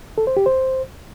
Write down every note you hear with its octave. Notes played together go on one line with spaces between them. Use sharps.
A4
C5
G4
C5